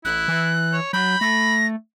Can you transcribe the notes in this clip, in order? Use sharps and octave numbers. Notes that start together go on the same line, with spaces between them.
A1 E4 F#6
E3
C#5
F#3 B5 G6
A3 A#6